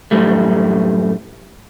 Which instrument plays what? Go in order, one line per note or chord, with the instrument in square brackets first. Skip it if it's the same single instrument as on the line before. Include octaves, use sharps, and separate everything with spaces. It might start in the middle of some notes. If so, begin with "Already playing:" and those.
[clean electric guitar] F#2 A2 G3 A3